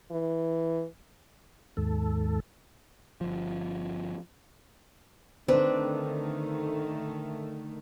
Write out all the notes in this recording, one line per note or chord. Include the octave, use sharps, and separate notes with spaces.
E3
D#2 G#2 A4
G1 F3
D3 D#3 A3 C4 D4 B4